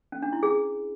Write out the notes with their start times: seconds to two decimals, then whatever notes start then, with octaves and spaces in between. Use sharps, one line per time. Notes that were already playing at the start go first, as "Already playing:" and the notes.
0.12 C#4
0.22 D4
0.33 E4
0.43 G#4